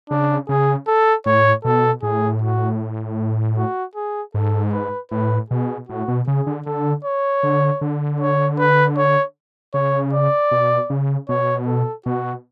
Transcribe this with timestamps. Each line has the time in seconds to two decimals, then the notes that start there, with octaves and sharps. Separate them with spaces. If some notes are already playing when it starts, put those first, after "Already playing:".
0.10 C#3 D4
0.49 C#3 G#4
0.87 A4
1.26 A2 C#5
1.65 B2 A4
2.03 A2 G#4
2.42 F#4
3.57 F#4
3.95 G#4
4.34 G#2 A4
4.72 B4
5.11 A2 B4
5.50 B2 G#4
5.89 A2 F#4
6.08 B2
6.27 C#3 G#4
6.47 D3
6.66 D3 A4
7.04 C#5
7.43 D3
7.81 D3
8.20 C#5
8.58 B4
8.97 C#5
9.74 C#3 C#5
10.13 D5
10.51 B2
10.90 C#3
11.29 B2 C#5
11.67 A4
12.06 B2 F#4